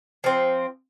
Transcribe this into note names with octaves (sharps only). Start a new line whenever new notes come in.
F3 C4